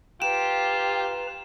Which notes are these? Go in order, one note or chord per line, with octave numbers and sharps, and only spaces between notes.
F4 G4 B4 A#5 E7